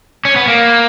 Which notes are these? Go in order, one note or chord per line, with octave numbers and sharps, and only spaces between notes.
C#4
B3
A#3